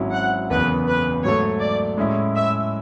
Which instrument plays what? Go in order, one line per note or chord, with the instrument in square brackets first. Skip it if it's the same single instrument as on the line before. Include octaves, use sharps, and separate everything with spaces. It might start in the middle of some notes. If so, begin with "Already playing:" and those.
Already playing: [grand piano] G#1 G#2 F#3 C#4 E4
[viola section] F#5
[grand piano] F#1 E2 C#3 [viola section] B4
[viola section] B4
[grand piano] G#2 F#3 A3 [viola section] C#5
[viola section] D5
[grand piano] A2 G#3 C#4 E4
[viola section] E5